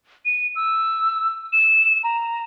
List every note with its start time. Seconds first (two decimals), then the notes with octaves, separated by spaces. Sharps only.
0.25 D#7
0.56 E6
1.53 E7
2.04 A#5